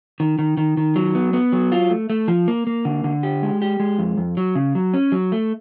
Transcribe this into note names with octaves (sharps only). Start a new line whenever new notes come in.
D#3
D#3
D#3
D#3
F#3
B3
B3
F#3
F4
A3
A3
F3
A#3
A#3
D3
D3
G4
G#3
G4
G#3
F2
F2
F#3
C#3
F#3
C#4
F#3
A3